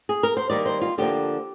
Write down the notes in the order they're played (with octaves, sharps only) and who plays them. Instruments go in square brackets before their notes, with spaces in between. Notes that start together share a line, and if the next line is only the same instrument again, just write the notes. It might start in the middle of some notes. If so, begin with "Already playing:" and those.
[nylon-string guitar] G#4
A#4
C5
D#3 G3 A#3 D5
C5
F4
D3 F3 A#3 G4